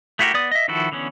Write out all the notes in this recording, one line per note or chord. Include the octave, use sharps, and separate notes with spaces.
A3 E4 F#4 G4 A#4
B3 D5 D#6
D#5 E5
D#3 F3 E4 F#4 A4
D3 E3 B3 C#4